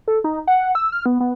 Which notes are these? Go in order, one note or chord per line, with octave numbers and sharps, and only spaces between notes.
A4
D#4
F#5
E6
F6
B3
B3